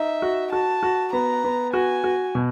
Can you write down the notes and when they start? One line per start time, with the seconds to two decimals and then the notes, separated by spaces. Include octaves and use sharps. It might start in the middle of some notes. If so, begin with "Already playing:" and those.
Already playing: D#4 E5
0.22 F#4
0.52 F#4 A5
0.83 F#4
1.13 B3 A#5
1.44 B3
1.73 F#4 G#5
2.04 F#4
2.35 B2